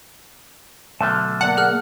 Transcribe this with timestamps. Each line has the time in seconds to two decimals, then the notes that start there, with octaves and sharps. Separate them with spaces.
1.01 B1 D3 A3 A5 C6 F6
1.41 A#3 D5 F#5 A5
1.57 G#4 F6 F#6